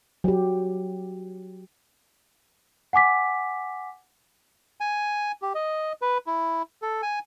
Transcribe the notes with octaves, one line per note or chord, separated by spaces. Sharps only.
F#3 G4
F#5 G#5 D6 B6
G#5
G4
D#5
B4
E4
A4
G#5